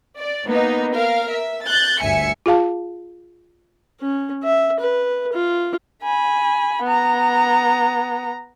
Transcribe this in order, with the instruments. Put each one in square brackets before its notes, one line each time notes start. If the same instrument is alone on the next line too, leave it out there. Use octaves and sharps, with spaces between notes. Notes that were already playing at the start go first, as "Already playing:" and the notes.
[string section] D5
A#3 B3 D#4
A#4 F5
E5
F#6 G6 A6
G1 D2 E5 G#5 C#7
[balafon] F4 G#4 F5 A5
[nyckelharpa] C#4
E5
B4
F4
[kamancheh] G#5 B5
B3 A#5